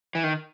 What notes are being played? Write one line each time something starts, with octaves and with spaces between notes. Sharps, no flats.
E3
D#3